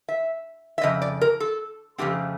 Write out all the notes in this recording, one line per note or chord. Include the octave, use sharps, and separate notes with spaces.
E5
E5
F2 C#3 D#5
D5
A#4
A4
F2 C#3 F3 A3 C4 G4